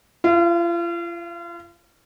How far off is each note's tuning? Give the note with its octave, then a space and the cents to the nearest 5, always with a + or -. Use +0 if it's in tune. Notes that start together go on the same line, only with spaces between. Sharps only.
F4 -40 F5 +15